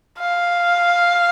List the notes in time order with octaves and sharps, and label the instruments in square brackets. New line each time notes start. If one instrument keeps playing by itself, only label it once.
[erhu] F5